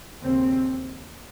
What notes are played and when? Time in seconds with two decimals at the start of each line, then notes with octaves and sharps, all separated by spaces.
0.22 D#2 C#3 C4